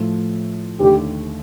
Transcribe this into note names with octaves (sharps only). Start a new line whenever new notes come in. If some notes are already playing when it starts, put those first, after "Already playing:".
Already playing: A2 F3 A3
D#2 D3 A3 G4